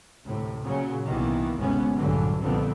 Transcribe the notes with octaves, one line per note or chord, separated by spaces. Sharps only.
D2 A2 C3
A#2 C#3 F#3
C2 C3 D#3 E3 A#3 B3
G#1 D2 G#2 C3 B3 C#4
A#1 G2 D3 E3 F#3
C2 F2 A#2 D3 B3 C4